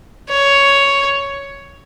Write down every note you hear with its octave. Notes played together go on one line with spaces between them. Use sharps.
C#5